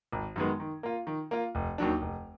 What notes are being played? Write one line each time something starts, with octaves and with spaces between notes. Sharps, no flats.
G#1
F#2 D#3 G#3 B3
D#3
A#3 F4
D#3
A#3 F4
F1
D#2 D#3 F#3 D4
F1